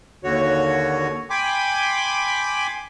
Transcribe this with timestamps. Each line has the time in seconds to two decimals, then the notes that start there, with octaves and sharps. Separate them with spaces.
0.24 D#2 D3 F#4 C#5
1.30 G5 G#5 B5 C6 D6